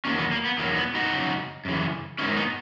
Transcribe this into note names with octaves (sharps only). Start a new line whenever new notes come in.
E2 D#3 F#3 A#3 C#4
B3
A#3
B3
E2 D#3 F#3 A#3
B3
D#4 F#4
F#2 C#3
F#2 C#3 E3
G#2 D#3 F#3 C#4 E4
B3 D#4